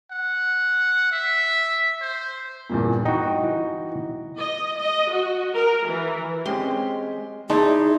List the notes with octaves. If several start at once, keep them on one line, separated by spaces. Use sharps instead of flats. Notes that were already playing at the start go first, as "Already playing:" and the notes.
F#5
E5
C5
E2 G2 A#2
D#4 F#4 G5
E3
D#5
D#5
F#4
A#4
E3
G#3 C4 C#4 G4 C6
D#4 E4 G#4 D5 A5 C6